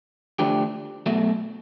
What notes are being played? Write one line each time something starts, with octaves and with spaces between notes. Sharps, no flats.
D3 F3 A3 D4 G4
B1 B2 F#3 A3